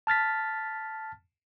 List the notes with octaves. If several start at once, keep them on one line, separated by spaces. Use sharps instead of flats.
A5 F6 A6 B6